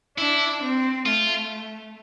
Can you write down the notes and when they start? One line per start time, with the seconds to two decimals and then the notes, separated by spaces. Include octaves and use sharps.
0.18 D4 E4
0.62 C4
1.06 A3 F4